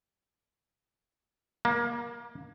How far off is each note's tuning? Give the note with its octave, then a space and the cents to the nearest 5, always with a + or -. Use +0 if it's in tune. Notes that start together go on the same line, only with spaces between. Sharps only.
A#3 +25